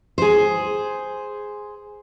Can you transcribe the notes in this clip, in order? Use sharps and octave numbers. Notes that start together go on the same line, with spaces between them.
G#4 C5